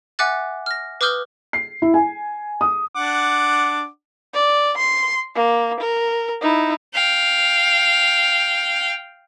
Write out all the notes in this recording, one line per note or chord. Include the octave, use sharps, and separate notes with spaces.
E5 F#5 G#5 D6 F#6 A6
F6 A#6
B4 D6 D#6 F6 G6 G7
C7
E4
G#5
D#6
D4 F#5 D6
D5
C6
A#3
A#4
D#4 E4
F5 G5